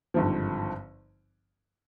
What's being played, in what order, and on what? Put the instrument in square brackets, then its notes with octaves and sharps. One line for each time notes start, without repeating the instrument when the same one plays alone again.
[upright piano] G#1 G2 D3 F3